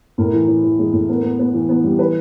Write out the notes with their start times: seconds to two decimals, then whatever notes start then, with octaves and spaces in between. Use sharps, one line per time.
0.18 A2 A#4
0.33 E3
0.48 E3
0.63 E3
0.79 G#3
0.93 A2
1.09 B3 A#4
1.23 B3
1.39 B3
1.54 E3
1.69 B3
1.84 G3
1.99 E3 B4